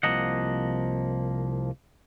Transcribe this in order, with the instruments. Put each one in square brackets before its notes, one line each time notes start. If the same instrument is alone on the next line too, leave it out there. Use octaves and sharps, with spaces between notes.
[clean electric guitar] C2 F3 A#3 D#5 F#5